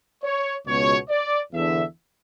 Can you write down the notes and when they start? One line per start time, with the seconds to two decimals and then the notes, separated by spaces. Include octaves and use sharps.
0.24 C#5
0.66 C#2 B2 C#5
1.09 D5
1.53 E2 D3 E5